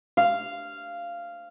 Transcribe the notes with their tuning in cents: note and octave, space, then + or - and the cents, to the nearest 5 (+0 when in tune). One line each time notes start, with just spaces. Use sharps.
F5 -10